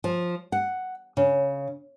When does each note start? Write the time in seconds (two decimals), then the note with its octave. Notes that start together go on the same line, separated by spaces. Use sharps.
0.04 F3
0.52 F#5
1.17 C#3